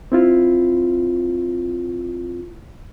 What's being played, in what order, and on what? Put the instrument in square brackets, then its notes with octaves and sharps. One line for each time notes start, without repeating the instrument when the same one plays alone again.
[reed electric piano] C4 E4 F4